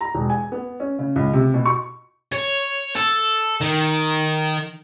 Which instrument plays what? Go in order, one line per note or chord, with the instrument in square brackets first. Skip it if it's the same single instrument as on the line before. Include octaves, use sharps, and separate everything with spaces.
[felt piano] A#5
E1
G#5
B3
C#4
C#3
C#2
C3
B2
C#6
[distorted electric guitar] C#5
A4
D#3